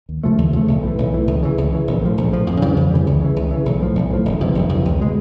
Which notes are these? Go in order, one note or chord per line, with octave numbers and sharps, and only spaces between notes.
D#2
C#3 F3 A3
D#2
C#3 F3 A3
B1
A2 E3
B1
A2 E3
C#2
C#3 E3
C#2
C#3 E3
A#1
A2 F3
A#1
A2 F3
F2
C#3 E3 G3
F2
C#3 E3 G3
C#2
C#3 E3
C#2
C#3 E3
B1
A2 F3
B1
A2 F3
F#1
F2 C3 E3
F#1
F2 C3 E3
C#2
B2 G#3